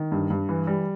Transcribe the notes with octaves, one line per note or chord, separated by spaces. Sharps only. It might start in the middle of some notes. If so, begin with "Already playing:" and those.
Already playing: D#3
G2
G2
E3
G3